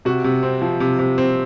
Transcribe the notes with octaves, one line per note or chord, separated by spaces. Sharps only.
C3 F#4
C3
C4
F3
C3
C3
C4